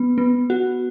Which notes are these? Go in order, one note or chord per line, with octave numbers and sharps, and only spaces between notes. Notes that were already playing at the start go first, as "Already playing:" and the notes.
Already playing: B3
B3
F#4